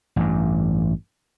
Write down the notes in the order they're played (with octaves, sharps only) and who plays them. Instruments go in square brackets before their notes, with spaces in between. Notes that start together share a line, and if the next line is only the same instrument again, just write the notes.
[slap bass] A1 G2